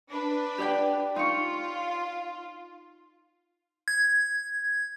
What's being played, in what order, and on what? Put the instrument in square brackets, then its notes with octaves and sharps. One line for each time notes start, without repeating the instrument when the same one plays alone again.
[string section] D4 B4
[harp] G4 D5 G5
[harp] D#4 C#6 [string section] F4
[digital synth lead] G#6